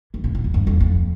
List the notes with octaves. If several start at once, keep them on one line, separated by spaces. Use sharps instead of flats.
E3
C3
A#2
F2
G2
F2
F2